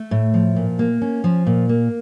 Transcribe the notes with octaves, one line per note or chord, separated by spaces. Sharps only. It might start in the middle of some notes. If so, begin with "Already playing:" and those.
Already playing: A3
A2
F3
A#2
A#3
C#4
F3
A#2
A#3